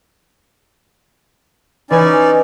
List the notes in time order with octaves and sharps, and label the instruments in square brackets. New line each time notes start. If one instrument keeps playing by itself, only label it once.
[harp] E3 B4 G#5 [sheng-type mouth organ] C#4 D#4 D5